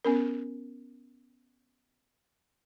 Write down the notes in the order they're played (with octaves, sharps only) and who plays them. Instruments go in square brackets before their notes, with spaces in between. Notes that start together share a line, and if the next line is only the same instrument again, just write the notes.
[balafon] B3 C#4 A#4